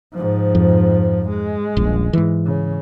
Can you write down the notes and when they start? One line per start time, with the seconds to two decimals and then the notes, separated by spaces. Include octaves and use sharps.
0.13 G#2 F3
0.55 F2
1.29 G#3
1.77 D#1 A#1
2.13 G#2 E3
2.46 C#3